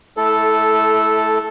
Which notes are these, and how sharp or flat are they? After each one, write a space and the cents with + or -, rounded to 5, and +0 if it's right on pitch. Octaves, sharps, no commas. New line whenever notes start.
A3 -25 E4 -10 A4 -5